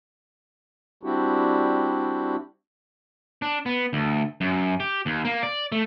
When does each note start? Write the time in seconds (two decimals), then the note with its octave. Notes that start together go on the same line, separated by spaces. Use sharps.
1.03 G3 C4 D4 E4 F#4 G4
3.42 D4
3.66 B3
3.93 D2
4.41 F#2
4.80 G4
5.06 D#2
5.25 A#3
5.43 D5
5.72 A3